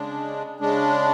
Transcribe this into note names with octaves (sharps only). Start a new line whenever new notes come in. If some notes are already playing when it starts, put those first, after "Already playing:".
Already playing: C#3 G#3 D4
C#3 G#3 D4